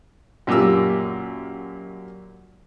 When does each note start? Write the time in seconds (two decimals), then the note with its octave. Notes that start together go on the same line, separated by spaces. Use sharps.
0.47 F#2 A#2 G4 D6 E6